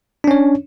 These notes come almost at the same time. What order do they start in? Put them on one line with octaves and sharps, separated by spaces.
D4 C#4 C#5